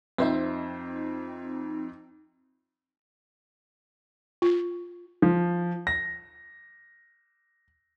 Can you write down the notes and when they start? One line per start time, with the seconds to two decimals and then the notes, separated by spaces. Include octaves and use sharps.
0.18 F2 C4 D#4 C5 E5
4.42 F4
5.22 F3
5.87 A#6